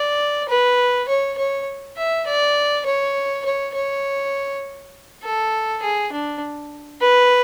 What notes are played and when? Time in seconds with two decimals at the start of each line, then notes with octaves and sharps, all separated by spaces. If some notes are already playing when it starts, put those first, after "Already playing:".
Already playing: D5
0.49 B4
1.08 C#5
1.37 C#5
1.97 E5
2.26 D5
2.86 C#5
3.45 C#5
3.74 C#5
5.23 A4
5.82 G#4
6.12 D4
7.01 B4